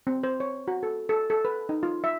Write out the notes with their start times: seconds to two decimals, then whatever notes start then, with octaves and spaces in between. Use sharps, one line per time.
0.07 C4
0.23 C5
0.40 C#5
0.68 F#4
0.83 A4
1.09 A4
1.30 A4
1.45 B4
1.69 D#4
1.83 F4
2.04 E5